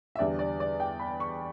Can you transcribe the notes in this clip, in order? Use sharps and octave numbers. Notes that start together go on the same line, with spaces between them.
E5
E2 D3 G3 D5
D5
D5
G5
B5
C#6